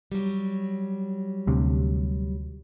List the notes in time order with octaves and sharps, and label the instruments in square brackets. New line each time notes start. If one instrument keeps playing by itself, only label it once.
[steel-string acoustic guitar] F#3 G3
[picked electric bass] D2 C3